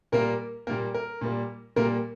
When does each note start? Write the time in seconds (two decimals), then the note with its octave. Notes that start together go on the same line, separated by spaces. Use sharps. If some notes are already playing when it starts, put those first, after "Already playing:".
0.12 A#2 G3 A#3 A#4
0.67 A#2 G3 A#3 A#4
0.94 A#4
1.21 A#2 G3 A#3
1.76 A#2 G3 A#3 A#4